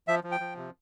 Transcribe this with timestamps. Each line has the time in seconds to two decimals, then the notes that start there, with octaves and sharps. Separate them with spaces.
0.08 F3 E5
0.24 F3
0.32 G5
0.40 F3
0.57 C3